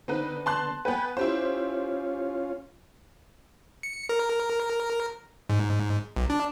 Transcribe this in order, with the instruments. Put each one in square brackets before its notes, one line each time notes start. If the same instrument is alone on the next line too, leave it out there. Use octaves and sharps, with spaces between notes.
[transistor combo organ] D3 B3 [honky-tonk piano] C4 D#4 B4
[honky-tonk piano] A5 C6 F#6
[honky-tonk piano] B3 B4 [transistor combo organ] G5 G#5 B5
[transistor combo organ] C#4 F4 [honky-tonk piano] E4 G4 C5
[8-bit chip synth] C#7
A#4
G#2
B1
D4